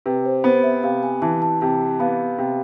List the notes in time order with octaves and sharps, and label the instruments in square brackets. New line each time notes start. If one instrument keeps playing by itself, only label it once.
[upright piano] C3 [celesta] B4
[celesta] C5
[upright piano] B3 [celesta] C5
[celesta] E5
[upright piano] C3 [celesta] F5
[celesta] G#5
[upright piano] E3 [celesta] A5
[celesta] A5
[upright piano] C3 [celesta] A5
[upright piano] B3 [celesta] F5
[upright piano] C3